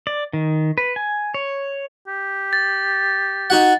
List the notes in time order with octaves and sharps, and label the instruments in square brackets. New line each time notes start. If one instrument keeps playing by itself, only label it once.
[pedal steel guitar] D5
D#3
B4
G#5
C#5
[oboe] G4
[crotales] A6
[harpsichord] D#4 F#4 F#5